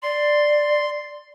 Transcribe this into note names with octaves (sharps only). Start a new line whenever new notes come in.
D5 C6